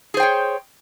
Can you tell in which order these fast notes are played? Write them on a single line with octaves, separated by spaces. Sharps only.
G#4 C5 G5 C#5